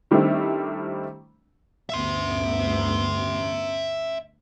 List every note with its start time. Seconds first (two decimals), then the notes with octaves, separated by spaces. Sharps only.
0.11 D#3 G3 A3 C4 D4 E4
1.90 D2 G2 B3 E5 C6